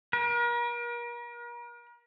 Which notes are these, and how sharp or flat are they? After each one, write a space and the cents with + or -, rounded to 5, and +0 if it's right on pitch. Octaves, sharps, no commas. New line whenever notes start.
A#4 +40